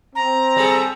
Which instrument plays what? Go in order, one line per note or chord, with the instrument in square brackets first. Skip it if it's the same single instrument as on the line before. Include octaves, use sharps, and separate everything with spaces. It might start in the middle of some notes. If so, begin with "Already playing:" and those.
[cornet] C4 [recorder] A#5
[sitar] G3 G#4 A4